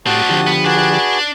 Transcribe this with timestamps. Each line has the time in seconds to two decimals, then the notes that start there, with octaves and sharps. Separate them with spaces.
0.06 A2 C4 D4 F#4 G4 A5 D#6
0.29 D3 F3 G4
0.47 B3
0.64 D4 F#4 G#4 B4 D5